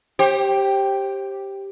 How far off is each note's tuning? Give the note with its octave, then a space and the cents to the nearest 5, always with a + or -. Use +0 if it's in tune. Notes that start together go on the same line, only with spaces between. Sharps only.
G4 +0 C5 +35